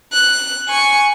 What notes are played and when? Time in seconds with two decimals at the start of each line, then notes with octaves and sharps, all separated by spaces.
0.13 F#6
0.69 G#5 C#6